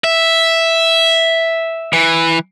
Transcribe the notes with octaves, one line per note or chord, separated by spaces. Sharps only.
E5
E3